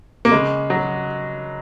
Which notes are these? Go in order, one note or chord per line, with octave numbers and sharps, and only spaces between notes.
A#3
C#3 G#3
F#3